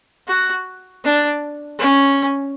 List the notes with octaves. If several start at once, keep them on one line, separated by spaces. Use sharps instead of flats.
F#4
D4
C#4